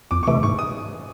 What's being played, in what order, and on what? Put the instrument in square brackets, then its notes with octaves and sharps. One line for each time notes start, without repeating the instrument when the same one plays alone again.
[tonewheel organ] F2 [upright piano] D6
[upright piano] C#6
[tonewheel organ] C3 E3 A3 [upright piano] D6
[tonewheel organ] G#2 [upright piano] C#6
[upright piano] D#6